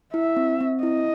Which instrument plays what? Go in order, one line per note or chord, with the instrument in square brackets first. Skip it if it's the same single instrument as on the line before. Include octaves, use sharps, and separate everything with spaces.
[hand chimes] E4 [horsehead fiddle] E5
[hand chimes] C4
C4
[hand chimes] E4 [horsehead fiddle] D#5